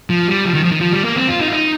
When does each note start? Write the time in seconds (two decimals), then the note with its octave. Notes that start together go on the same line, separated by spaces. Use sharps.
0.10 F3
0.28 G3
0.45 F3
0.54 D#3
0.64 F3
0.72 D#3
0.81 F3
0.93 G3
1.05 A#3
1.16 C4
1.28 F4
1.40 D#4
1.48 F4
1.52 D#4